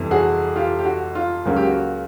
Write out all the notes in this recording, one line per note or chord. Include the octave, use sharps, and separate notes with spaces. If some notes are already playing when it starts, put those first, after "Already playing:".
Already playing: G1 F2 C3 E3
F#4 G#4
F4 G4
G4
F#4
F4
C#2 C#3 F#3 A#3 F#4
G4
F#4